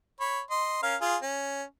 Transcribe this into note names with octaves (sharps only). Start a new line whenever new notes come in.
C#5 B5
D#5 C6
C#4 A#4 F5
F4 G#4
C#4